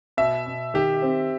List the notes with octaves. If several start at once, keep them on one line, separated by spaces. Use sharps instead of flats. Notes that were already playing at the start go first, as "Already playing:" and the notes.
B2 E5
B2
D#3 G4
C4